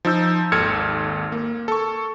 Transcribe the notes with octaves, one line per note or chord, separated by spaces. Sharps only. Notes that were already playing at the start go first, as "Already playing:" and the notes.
F3 D#4 E6 G6
G#1 D#2 A4 F6 G#6 C#7
A#3
A4 C#6